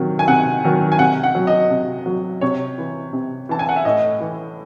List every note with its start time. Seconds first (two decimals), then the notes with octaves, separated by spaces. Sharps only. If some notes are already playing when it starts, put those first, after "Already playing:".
Already playing: C3 D#3 F#3
0.19 G#5
0.28 C3 F#5
0.64 D#3 F#3
0.92 G#5
0.99 C3 F#5
1.23 F#5
1.35 F#3
1.47 D#5
1.70 C3
2.06 F#3
2.41 C3 C#5
2.78 E3
3.13 C3
3.49 E3 A5
3.59 G#5
3.69 F#5
3.76 E5
3.85 A2 D#5
4.20 E3